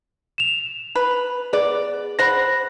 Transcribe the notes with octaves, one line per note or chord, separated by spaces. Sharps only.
E7 F7
B4
B3 G#4 D5
C5 F#5 B5 A#6